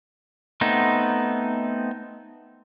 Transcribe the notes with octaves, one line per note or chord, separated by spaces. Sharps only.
A3 B3 C4 D#4